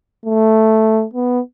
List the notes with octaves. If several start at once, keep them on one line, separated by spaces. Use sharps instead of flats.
A3
B3